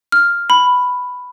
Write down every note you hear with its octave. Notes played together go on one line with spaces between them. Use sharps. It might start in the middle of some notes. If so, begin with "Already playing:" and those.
F6
B5